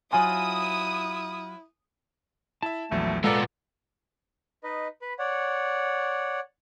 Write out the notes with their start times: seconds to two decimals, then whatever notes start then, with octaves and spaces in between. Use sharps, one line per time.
0.13 F#3 E4 F4 G#5 D#6
2.62 E4 E5 A5
2.91 A#1 E2 F#3 A3
3.24 A#2 G#3 B3 A4 D5 F5 A#5 D6
4.63 D#4 B4 D#5
5.02 B4 B5
5.19 C#5 D5 F#5